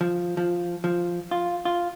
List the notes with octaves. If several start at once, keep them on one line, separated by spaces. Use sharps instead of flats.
F3
F3
F3
F4
F4